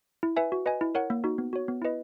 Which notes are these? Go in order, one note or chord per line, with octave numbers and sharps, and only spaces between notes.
E4
B4 E5 G#5
F#4
B4 D#5 G#5
E4
A#4 C#5 F#5
A#3
D#4 F#4
B3
F#4 C#5
B3
E4 B4 D#5